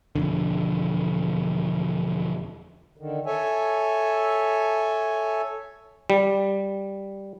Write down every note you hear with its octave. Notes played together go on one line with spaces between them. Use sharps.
E1 F2 D3
D3 D#3
A4 C#5 E5 G#5
G3